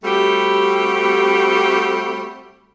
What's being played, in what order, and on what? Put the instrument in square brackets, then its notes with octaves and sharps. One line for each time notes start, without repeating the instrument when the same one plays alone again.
[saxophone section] G3 A3 C4 F#4 G4